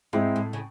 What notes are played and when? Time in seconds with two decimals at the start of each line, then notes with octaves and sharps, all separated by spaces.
0.13 G#2 G#3 C4 E4
0.36 A2
0.53 C#3